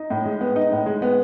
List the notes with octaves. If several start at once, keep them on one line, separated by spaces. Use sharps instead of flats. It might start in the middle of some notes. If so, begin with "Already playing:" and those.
Already playing: D#4
A2
G#3
B3
D#4
A2
G#3
B3